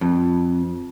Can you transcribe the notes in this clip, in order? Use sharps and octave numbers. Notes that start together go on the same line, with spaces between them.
F2